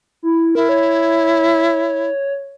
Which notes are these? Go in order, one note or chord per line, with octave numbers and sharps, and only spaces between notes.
E4
E4 A#4
C#5